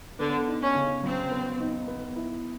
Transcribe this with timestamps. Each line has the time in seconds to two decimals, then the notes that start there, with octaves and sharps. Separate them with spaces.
0.19 D3 B3 D4
0.47 D#4
0.62 C#4
0.75 C#3
1.03 F#3 C4
1.31 B3
1.60 D#4
1.88 B3
2.16 E4